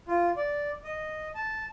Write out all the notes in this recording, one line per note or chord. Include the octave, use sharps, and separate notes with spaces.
F4
D5
D#5
A5